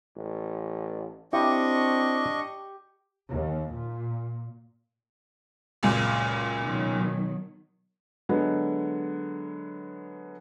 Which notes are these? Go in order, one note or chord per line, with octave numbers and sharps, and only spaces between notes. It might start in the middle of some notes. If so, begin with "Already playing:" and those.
A1
C4 D4 E4 G4 D#5 C#6
D#2
A#2
C#2 F#2 A#2
B2 D#3 F#3
D3 F#3 G#3 B3